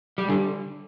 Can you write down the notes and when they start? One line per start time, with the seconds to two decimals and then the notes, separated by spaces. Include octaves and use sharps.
0.18 G3
0.29 D3